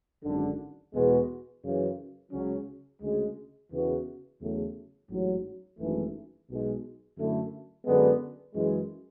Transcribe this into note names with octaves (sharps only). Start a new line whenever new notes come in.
G#1 F#2 D3
E2 B2 G#3 B3 F#4
F#2 C#3 E3
C#2 C#3 F#3 C#4
D2 C#3 G#3
E2 C#3 E3 B3 F#4
E2 C#3 F#3 A3
A1 G#2 F#3
G#1 F#2 E3 A3
B1 B2 G#3
F#2 D3 A3 E4
F#2 D3 G#3 B3 D4
F#2 E3 G#3